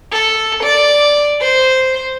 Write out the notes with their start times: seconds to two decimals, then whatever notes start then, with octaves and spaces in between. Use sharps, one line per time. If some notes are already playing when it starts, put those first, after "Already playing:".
0.12 A4
0.63 D5
1.41 C5